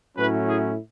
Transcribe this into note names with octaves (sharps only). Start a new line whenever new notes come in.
A2 F#3 C#4 E4 B4
G#4